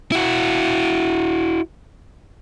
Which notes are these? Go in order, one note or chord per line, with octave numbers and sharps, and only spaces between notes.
E4 F#4